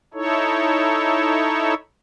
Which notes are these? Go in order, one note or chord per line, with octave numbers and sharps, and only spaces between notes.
D#4 E4 A4 C#5